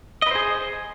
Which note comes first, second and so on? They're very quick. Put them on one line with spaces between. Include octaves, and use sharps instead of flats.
D#5 B4 C5 G#4